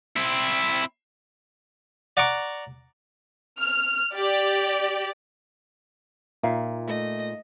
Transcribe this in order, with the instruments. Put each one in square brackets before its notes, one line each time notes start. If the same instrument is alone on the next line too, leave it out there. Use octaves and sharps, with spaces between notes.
[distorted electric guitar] C4 E4
[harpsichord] D5 F#5 A#5 C#6 D6
[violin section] F6
G4 D5
[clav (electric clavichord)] A#2 [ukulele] D#4 E5 F5
[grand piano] A3 [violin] D#5